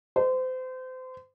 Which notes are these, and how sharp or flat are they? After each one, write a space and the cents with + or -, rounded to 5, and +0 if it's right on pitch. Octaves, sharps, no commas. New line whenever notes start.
C5 -30